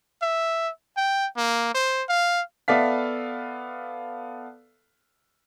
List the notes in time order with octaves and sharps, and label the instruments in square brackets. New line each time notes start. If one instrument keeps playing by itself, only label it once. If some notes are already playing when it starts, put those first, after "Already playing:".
[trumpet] E5
G5
A#3
C5
F5
[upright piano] B3 A4 D5 E5 F5 B6